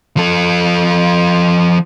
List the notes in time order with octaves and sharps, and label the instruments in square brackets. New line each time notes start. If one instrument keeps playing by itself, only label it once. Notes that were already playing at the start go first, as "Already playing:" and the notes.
[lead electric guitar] F3 A4